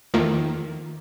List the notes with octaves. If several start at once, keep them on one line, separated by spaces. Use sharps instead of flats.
E2 D#3 F3 A3 A#3